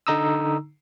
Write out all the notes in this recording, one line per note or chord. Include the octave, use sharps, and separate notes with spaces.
D3 D#4 A#5 D#6 E6